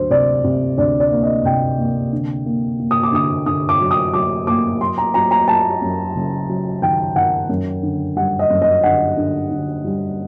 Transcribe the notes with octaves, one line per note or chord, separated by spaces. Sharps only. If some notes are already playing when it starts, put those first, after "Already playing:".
Already playing: D2 F#3 C5
C3 D5
C3
D2 D5
D5
A#3
D#5
C3 G5
A#3
D3
A#3
A#3
D#6
D6
D3 D#6
D3 D#6
D6
F#3
D#6
F#3 D6
A#3 D6
F#3 C6
A#5
F#3 A#5
A#5
F#3 A5
F#2
F#1
F#3
D#3 G5
D#3 F#5
F#2
D3
G3 F#5
D#5
F#2
D#5
D3 F#5
D3
D3
G3